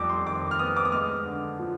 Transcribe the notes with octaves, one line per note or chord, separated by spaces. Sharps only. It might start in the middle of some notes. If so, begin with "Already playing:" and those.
Already playing: F2 G3 D6
C6
D#3 D6
F6
B3 D#6
D6
D#6
G#3 F6
D3
F3